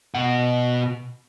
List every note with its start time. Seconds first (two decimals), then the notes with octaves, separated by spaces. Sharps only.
0.15 B2 F#5